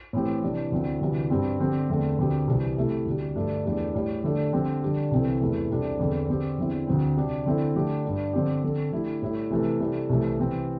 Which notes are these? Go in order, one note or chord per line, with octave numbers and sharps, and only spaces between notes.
A2 E3 C4 G4
C3 E3 G3 D4
D2 D3 C4 E4
D2 C3 E3 G3
G2 G3 C4
D3 C4 G4
E2 D3 A3 C4
D2 D3 C4 G4
C2 C3 E3 G3
C3 A3 E4 G4
D2 C3 G3
G2 D3 A3 D4
E2 E3 A3 D4 G4
A2 G3 E4
D3 A3 D4 G4
D3 G3 C4 G4
D3 G3 D4 G4
C2 C3 E3 C4 A4
E2 C3 E3 A3
C2 C3 G3 D4 A4
E2 D3 C4 A4
D3 C4 G4
E2 D3 C4 E4
D2 D3 C4
C3 G3 D4 G4
D3 C4 E4 A4
D3 A3 D4 G4
G2 G3 D4
D3 C4 G4
D3 C4 A4
D3 A3 E4 G4
A2 G3 E4 A4
C3 E3 A3
C3 G3 E4 A4
C2 C3 E3 A3
C3 E3 C4